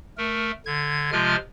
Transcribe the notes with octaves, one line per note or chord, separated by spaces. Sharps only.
A3 A#4
D3 G#6
C3 F3 G#3 F4 F6